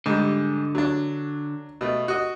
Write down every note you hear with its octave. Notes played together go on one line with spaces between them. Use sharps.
G#2 D3 G3
F#3 D4
B2 A3
F#4 D#5